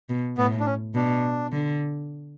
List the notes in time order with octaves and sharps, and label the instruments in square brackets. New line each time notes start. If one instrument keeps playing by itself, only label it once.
[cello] B2
[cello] A2 [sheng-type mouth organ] B3
[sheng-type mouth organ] D4
C#4
[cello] B2 [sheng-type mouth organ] D4
[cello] D3